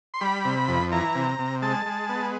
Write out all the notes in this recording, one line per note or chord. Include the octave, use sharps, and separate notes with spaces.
C6
G3 B5
C3
F2
E3 A#5
C3
C3
G#3 A5
G#3
B3